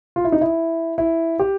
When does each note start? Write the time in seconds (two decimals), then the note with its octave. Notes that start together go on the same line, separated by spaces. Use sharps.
0.16 F4
0.24 E4
0.32 D#4
0.41 E4
0.98 E4
1.39 G4